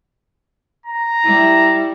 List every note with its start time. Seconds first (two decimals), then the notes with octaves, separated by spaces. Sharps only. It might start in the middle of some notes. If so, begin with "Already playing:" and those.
0.86 A#5
1.23 G3 E4